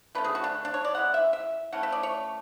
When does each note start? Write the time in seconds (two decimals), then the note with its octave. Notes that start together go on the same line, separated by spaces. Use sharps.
0.15 D3 A3 C#4 B4
0.24 G#4
0.35 F#4
0.44 D4
0.65 D4
0.74 C#5
0.85 D5
0.94 E3 G#3 C#4 F#5
1.14 E5
1.33 E5
1.73 E3 A3 C#4 F#5
1.83 E5
1.92 D5
2.03 C#5